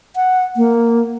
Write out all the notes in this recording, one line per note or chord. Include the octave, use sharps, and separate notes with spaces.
F#5
A#3